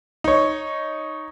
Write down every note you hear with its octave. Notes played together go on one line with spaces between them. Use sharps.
D#4 C#5